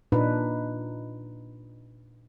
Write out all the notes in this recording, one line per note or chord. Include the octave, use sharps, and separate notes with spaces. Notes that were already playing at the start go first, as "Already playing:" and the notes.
A#2 D4 D#4 B4